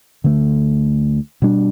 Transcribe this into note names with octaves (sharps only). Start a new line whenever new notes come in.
D2 D3 A3
B2 G3 D4